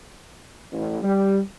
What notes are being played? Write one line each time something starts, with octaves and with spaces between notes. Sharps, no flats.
A1
G3